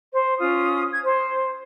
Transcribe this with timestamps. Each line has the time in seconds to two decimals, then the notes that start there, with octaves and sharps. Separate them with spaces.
0.13 C5
0.39 C#4 F4 D#6
0.92 G#6
1.04 C5